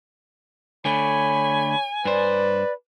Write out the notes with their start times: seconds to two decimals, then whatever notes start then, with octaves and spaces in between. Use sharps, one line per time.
0.85 D3 A3 C#5 G#5 B5
2.05 G2 B4 C5 D5